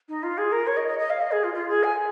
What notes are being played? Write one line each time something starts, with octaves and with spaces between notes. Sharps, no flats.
D#4
F4
G#4
A#4
C#5
D#5
D#5
D#5
F5
D#5
G#4
F4
F4
G#4
G#5